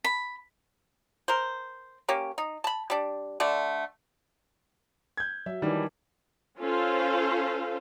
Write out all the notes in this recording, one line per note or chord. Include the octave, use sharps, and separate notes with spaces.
B5
A#4 C5
A#3 C#4 G4
D#4
A5 B5
G3 D4
D3 A3 D4
G6 G#6
F#3 E5
D#3 E3 G3 D4 D#4
C#4 F4 A4 C5 F5